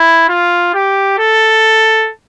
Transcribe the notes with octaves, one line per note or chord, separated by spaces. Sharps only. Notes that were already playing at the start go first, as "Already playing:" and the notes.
Already playing: E4
F4
G4
A4